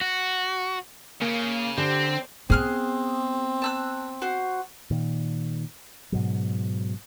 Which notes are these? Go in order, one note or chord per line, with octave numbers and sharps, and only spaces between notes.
F#4
C#3 A#3
D3 C4 G4
B3 C4 G#4 F6 F#6
A5 E6 F#6
F#4 C5
A#2 D#3
G#2 B2 F#3